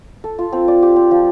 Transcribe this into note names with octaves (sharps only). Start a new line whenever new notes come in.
A4
F4
C4
D5
G4
C4
F3